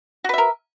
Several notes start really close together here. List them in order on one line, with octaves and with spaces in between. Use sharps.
F#4 B4 E5 A#4